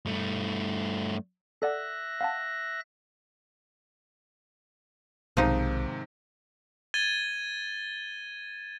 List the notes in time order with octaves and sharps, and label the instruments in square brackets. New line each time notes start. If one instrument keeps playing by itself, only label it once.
[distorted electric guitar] G2 A3
[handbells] A4 D5 F#5 [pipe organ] E5 F#6 A#6
[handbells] F5 F#5 A5
[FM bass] B1 [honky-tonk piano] G#2 C3 D#3 [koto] F3 D#4
[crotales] G#6 A6 D#7 G7